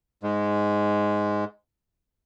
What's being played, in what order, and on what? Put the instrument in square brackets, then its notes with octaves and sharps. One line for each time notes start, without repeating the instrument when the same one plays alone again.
[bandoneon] G#2 G#3